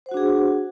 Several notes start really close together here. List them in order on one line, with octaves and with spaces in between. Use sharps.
C5 F#5 F#4 D4 G#4